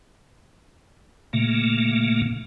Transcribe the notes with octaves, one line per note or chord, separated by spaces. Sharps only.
A#2 C#3 A3 A#3